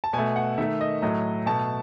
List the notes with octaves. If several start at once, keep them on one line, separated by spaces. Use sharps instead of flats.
A5
B2 A3 G#5
F#5
D#3 A3 E5
D#5
A2 F#3 A3 D#5
B2 A3 A5